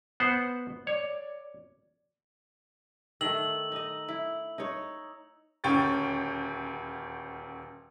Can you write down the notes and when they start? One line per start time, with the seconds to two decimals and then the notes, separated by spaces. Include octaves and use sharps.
0.20 B3 C5 F#5
0.87 C#5 D5
3.21 D#3 A3 E6 F#7
3.72 D#4 D#5
4.09 E4
4.58 D#4 C#5
5.64 D#1 D2 C#4 G5 C#6 A6